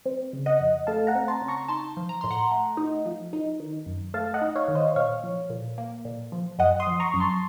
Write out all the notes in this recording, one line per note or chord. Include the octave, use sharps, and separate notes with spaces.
C4
C#3
D#5 F#5
F2
A3 F5 A5
F#5 A#5
C4
A5 C6
C#3
A#5 C#6
D#4 A5 C6
F3
A#5
A2 C6
F#5 A#5
A3
D#4
F3
D#4
D#3
F#2
A3 F5 A5
D#5 F#5
D#4
C#5 F5
D#3
C5 D#5
A#2 C#5 F5
F3
A#2
A#3
A#2
F3
F#2 D#5 F#5
C6 D#6
F3
A#5 C#6
F#2
A5 C6